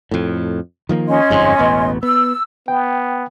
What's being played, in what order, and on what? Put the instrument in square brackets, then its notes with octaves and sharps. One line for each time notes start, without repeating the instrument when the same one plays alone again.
[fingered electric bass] F2 A2
D#3 F3 A#3
[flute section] C#4 D#5 C6
[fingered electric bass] G1 F2 G#2
E1 A1 B3
[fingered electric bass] B3 [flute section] E6
[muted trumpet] B3 [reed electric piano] G5